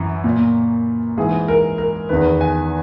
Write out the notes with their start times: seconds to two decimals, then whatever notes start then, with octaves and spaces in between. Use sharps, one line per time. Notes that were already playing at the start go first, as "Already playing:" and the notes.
Already playing: F#2 E3
0.24 A#2
1.18 G#2 E3 G#4
1.48 A#4
1.78 A#4
2.09 E2 D#3 B4
2.41 G#5